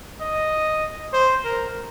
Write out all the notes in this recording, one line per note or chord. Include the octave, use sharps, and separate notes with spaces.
D#5
C5
A#4